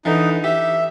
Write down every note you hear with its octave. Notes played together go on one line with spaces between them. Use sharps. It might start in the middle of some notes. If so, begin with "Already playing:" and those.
D3 E3 D#4
G4 E5